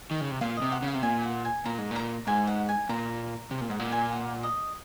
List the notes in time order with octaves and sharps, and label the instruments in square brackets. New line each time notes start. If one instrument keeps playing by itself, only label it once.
[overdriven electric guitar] D#3
C#3
C3
[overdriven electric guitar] A#2 [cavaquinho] F5
[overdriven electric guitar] C3 [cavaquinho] D#5
[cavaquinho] F#5
[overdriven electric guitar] C#3
[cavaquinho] F5
[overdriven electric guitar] C3
[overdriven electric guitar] A#2 [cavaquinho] G#5
[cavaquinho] F#5
G#5
[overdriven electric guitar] A#2 [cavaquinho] A#5
[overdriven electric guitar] G#2
[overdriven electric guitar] A#2 [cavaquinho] A#5
[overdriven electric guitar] G#2 [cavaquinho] G#5
[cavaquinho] F#5
G#5
[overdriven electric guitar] A#2 [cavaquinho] A#5
[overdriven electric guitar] C3
A#2
[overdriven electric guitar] G#2 [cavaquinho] F#5
[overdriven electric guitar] A#2
[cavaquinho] G#5
F#5
D#5